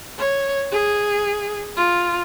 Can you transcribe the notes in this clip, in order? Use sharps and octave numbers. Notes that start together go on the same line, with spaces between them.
C#5
G#4
F4